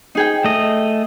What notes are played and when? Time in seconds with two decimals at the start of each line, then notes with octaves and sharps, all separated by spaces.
0.15 D#4 G#4 G5
0.44 A3 D#5